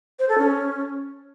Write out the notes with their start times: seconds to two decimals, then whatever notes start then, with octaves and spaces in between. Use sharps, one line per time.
0.19 C5
0.29 A4
0.38 C#4